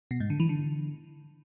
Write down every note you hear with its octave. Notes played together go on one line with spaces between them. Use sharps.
B2
G#2
D3
E3
D3